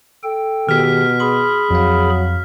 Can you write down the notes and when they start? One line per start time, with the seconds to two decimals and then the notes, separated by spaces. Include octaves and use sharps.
0.23 A4 G5
0.69 B2 D#3 G4 G#4 F6 B6
1.20 G#4 B5 C6
1.71 F2 F#3 F5